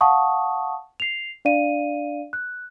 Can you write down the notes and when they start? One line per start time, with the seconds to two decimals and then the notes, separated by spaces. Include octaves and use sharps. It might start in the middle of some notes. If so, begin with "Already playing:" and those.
0.01 F5 F#5 A5 C#6 D#6
1.00 C7 F7
1.45 D4 D5 F5 D#7
2.33 F#6